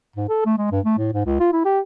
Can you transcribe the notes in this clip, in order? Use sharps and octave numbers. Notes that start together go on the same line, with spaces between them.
G#2
A4
A3
G#3
G2
A3
A2
G#2
C#2
F4
E4
G4